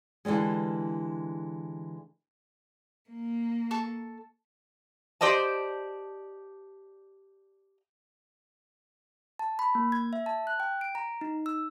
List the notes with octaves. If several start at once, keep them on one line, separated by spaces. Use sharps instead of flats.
D3 E3 F3 G3 G#3
A#3
A4 C#6
G4 C5 D5 D#5 A5
A5
B5
A#3
G#6
E5
A5
F#6
G5
D7
A#5
D#4
E6